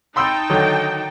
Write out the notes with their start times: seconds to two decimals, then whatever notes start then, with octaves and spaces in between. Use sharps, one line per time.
0.16 D#4 G5 A5 B5 C6 E6
0.49 D3 D#3 F#3